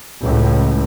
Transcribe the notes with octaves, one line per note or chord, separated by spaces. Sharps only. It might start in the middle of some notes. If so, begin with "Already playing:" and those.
C#2 A2